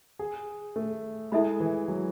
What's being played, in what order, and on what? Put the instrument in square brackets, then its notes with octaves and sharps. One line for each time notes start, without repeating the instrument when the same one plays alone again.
[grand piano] G#4
A3
[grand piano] G#3 [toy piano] E4 A4 E5 B5
[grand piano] E3
F#3